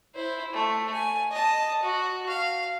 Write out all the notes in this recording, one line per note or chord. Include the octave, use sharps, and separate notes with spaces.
E4 C5
A3
G#5
D#5 A5
F#4
F5